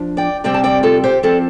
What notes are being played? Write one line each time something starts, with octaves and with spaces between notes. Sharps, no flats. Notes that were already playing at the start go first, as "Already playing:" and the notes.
Already playing: F3 D4
D5 G5
C3 G3 C4 D5 G5
A5
D5 G5
F4 A4
G4 C5
F3 C4 A4 D5